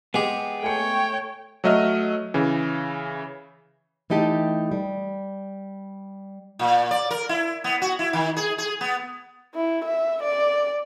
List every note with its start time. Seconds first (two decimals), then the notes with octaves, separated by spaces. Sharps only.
0.14 G#3 B3 G4 G#4
0.63 A3 C#5 G5 G#5 C#7
1.64 F#3 A3 D#5 E5 F6
2.34 C#3 E3
4.10 E3 A3 D#4 G4 A5
4.72 G3
6.59 A#2
6.91 D5
7.11 A#4
7.29 E4
7.64 B3
7.82 F#4
7.99 E4
8.13 D#3
8.36 G#4
8.58 G#4
8.81 B3
9.55 E4
9.85 E5
10.23 D5